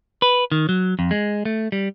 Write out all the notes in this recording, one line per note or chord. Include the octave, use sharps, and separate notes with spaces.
B4
D#3
F#3
F2
G#3
A3
G3